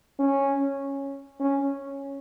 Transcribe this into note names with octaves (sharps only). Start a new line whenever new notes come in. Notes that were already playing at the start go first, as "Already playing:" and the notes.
C#4
C#4